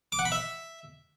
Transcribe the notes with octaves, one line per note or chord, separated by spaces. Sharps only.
D6
F#5
B5
E5